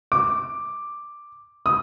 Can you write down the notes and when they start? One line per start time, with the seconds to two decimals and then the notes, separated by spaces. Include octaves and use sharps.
0.12 D6
1.66 D#6